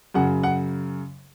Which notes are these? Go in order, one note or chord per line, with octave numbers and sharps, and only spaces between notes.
F#2 C#3 F#5
F#5